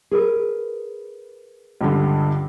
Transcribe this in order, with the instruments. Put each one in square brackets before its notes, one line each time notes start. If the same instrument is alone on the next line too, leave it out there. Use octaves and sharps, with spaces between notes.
[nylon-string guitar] G#4 A#4 B4
[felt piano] C#2 G2 D3